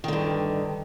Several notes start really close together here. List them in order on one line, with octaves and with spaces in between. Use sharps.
D#3 D3 G2